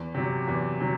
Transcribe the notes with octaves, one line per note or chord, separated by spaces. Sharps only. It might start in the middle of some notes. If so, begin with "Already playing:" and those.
Already playing: E2
C3 F#3
E2
C3 F#3